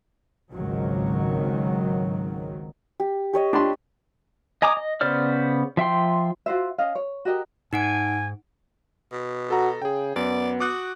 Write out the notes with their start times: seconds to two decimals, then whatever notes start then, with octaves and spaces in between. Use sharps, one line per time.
0.54 G#1 C#2 D#3 F#3
3.00 G4
3.33 G4 C#5 D#5
3.53 D4 G4 B5 C6
4.62 D#5 G#5 A#5 D6 D#6
4.77 D#5
5.01 C#3 B3 C5 D5 F6
5.77 F3 E5 G5 C6
6.46 F4 F#4 C5 E5
6.78 C#4 D#5 F5
6.95 C#5
7.25 F#4 G4 A#4 D#5
7.73 G#2 D#4 F#5 G#5 D7
9.12 B2
9.50 F#4 A4 A#5
9.82 C#3 G#4 G5
10.16 F#2 B3 D5
10.60 F#4 D6 D#6 F#6